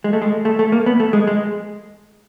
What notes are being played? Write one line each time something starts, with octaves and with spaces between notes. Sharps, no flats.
G#3
A3
G#3
A3
A3
A#3
B3
A3
G#3
G#3